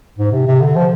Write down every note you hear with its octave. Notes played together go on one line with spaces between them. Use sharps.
G#2
C3
C3
D3
F3